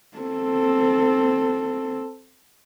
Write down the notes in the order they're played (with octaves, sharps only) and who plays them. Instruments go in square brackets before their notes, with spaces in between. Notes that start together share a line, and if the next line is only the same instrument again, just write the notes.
[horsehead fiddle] C4 A4